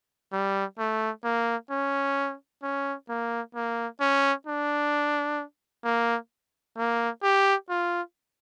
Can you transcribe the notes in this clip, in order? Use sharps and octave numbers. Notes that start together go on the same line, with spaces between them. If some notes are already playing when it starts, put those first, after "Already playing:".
G3
A3
A#3
C#4
C#4
A#3
A#3
C#4
D4
A#3
A#3
G4
F4